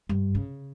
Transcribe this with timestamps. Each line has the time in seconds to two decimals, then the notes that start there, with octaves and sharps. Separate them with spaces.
0.09 G2
0.35 C#3